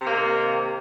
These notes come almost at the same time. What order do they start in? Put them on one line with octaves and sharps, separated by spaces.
C3 A#3 D#3